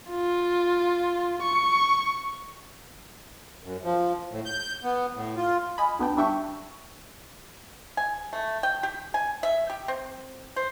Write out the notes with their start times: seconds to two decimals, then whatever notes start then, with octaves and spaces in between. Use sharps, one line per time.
0.11 F4
1.42 C#6
3.63 F#2
3.84 F3
4.31 A2
4.45 G6
4.84 B3
5.15 A2
5.36 F4
5.78 D#5 G#5 B5
5.99 D2 B3 D4 B4 G5
6.16 G1 G3 D4 E5 G5 C#6
7.97 G#5
8.33 A3
8.63 G5
8.83 G4
9.14 G#5
9.43 E5
9.70 G4
9.88 C4
10.56 C5